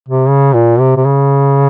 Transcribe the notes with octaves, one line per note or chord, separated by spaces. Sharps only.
C3
C#3
A#2
C3
C3
C#3